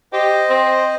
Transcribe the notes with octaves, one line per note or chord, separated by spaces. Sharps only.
G4 C5 D#5
C4